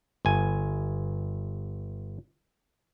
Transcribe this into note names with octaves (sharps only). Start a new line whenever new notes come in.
G1 G#5